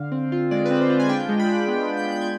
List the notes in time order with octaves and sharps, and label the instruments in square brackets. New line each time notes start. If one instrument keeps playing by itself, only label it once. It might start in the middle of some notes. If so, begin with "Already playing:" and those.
Already playing: [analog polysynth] D3 F5
C4
F4
G#3 D5
B4
C4
C5
F4
G#5
D4 G5
G#3
B5
D4
B3
B3
G6
G#3
G6
G#6